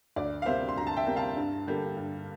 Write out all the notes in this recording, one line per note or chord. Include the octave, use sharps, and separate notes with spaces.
D2 D5
F5
C3 G3 A#3 C5 E5
C6
D2 A#5
A5
E5 G5
C3 G3 A#3
F5 A5
G2
D3 G3 A#3
G2